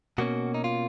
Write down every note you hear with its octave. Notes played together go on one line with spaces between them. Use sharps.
B2 A#3 C#4 F#4
D#4
F4